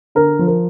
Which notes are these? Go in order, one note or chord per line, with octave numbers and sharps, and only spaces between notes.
D3 A#4
F3
A#4